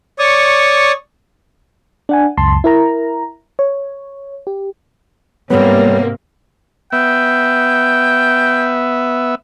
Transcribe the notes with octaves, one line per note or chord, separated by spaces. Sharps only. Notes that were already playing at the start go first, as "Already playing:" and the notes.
C#5 D5 C#6 D#6
D4 F#5 G#5
C#2 F#2 A5 C6
E4 A#4 A#5
C#5
G4
G#2 C3 G3 A#3 B3 C#5
B3 E5 G5